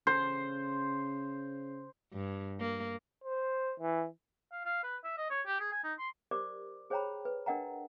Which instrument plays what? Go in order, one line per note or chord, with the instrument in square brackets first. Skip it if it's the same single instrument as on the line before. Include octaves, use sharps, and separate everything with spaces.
[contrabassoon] C#3 [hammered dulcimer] C5
[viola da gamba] G2
A#3
[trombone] C5
E3
[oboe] F5
F5
B4
E5
D#5
C#5
G4
G#4
G#5
D#4
C6
[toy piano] G4 A#4 C5 D5 D6
G#4 C5 C#5 G5 A#5 B5
B4
D4 A#4 D#5 F#5 G5 A#5